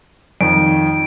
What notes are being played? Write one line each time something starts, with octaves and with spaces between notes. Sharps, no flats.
F2 D#3 D7